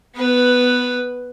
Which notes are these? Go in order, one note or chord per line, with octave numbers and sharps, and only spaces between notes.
B3 B4